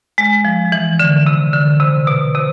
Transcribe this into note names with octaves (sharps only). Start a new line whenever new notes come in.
G#3
F3
E3
D3
C3
D3
C3
B2
C3